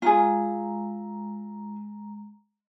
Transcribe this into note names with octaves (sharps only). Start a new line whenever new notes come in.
G#3 F4 G#4 A#5